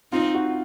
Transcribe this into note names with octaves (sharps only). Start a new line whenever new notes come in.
C4 D#4 F4
F#4